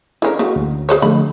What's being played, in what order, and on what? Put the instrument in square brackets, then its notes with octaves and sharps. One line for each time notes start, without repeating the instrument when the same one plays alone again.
[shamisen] D3 C#4 [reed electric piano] E4 G#4 A#4
[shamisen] C#3 [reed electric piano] A#3 F#4
[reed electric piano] D2
[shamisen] G#4 C5 C#5
[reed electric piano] D3 F3 A3 [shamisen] B5